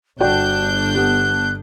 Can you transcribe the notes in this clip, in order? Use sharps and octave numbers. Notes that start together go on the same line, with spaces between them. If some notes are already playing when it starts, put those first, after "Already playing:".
G1 D4 F#4 D5 G5 F#6 G6
G3 B3 F#6